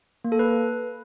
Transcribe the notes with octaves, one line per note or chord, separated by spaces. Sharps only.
A#3
A4
B4